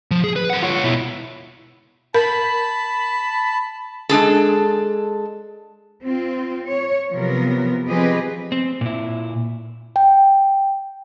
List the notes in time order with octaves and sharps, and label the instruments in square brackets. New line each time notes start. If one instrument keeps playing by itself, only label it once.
[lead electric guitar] F3
G#4
B4
A#4 F#5
F4 C#5
B2 E4
[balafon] A#4 [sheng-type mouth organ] A5 [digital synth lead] B5
[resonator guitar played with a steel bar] G#3 D4 G#4 A4
[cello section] C4 F4
C#5
C3 F3 F#3 B3 A#4
F3 C4 G4 G#4 B4 D#5
[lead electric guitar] C4
A#2 E4
[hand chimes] G5